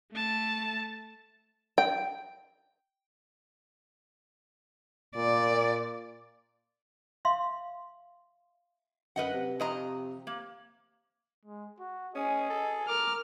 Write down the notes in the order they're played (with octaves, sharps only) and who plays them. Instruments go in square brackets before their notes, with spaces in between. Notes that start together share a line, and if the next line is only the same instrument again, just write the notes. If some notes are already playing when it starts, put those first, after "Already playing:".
[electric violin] A3 A5
[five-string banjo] G5
[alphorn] A#2 [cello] D5
[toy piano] E5 F5 C6
[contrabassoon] F#2 [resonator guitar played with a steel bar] B4 D#5 F#5
[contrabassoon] C3
[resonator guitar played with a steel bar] F2 D#5 A#5
A#3
[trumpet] G#3
F#4
[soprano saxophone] C#4 [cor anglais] G#4 [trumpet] D#5
[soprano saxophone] A4
[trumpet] A#4 [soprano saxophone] D6 [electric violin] F6